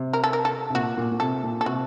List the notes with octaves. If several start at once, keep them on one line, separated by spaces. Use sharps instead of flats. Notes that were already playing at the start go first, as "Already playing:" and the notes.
Already playing: C3
A#4
A4
A#4
A4
C3
A#2 F#4
A#2
A#2
C3 A4
A#2
A4
C3 F#4